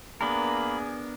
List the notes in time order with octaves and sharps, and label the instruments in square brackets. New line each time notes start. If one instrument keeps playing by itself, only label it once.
[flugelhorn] A#3 [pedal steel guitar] B3 D4 A#4 [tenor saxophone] G#4 [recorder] B5